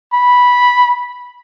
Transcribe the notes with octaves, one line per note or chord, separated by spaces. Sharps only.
B5